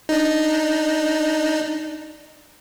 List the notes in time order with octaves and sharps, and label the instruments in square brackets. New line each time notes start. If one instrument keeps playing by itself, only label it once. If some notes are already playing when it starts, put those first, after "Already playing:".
[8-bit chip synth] D4 D#4